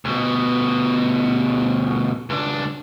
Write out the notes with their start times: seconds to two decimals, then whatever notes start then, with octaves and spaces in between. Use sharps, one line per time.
0.05 D2 B2
2.30 C#2 D4